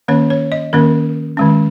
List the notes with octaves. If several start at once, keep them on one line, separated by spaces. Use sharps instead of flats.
D#3 A#3 C#4 C#5
C#5
D#5
D#3 A#3 C#4 A#4
D#3 G#3 C#4